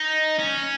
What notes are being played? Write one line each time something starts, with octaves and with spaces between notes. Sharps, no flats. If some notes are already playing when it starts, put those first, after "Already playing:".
Already playing: D#4
C#4